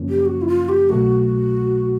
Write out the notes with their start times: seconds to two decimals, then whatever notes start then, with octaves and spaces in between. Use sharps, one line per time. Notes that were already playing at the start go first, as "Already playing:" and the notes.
Already playing: F#2 C#3 F3 A#3 C#4
0.09 G4
0.26 F#4
0.42 E4
0.47 F4
0.69 G4
0.89 C2 B2 F#3 A3 F#4